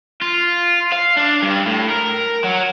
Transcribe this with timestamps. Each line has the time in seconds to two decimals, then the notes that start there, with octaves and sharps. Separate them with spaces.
0.22 F4
0.93 F5
1.17 D4
1.42 G2
1.66 A2
1.89 A#4
2.44 F#3